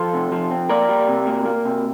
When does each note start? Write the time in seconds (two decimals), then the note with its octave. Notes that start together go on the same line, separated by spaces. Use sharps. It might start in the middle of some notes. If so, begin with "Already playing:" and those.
Already playing: F3 A4 C5
0.13 C3
0.32 F3
0.51 C4
0.69 A#3 A#4 D5
0.89 G3
1.08 C3
1.27 A#3
1.45 A#3
1.65 C3